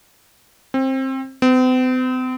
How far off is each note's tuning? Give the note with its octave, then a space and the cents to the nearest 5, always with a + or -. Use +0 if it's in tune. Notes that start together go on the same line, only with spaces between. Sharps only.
C4 +20
C4 -45